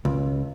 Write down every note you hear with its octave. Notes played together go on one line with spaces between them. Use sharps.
C#2